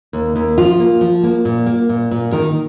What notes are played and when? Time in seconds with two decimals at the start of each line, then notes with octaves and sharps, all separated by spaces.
0.13 D#2
0.36 D#2
0.58 F3 F4
0.80 A#3
1.01 F3
1.23 A#3
1.45 A#2
1.66 A#3
1.89 A#2
2.11 A#2
2.32 D#3 A#4